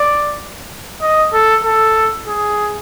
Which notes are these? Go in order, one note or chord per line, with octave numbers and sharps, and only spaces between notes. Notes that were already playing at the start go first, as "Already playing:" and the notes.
Already playing: D5
D#5
A4
A4
G#4